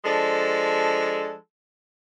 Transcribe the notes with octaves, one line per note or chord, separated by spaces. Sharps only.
F3 G#3 D4 A4